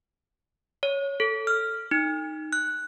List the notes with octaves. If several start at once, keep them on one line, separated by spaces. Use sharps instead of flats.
C#5
A4
F6
D#4
F#6